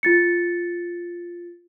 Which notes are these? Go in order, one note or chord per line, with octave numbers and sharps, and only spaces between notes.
F4 A6 C#7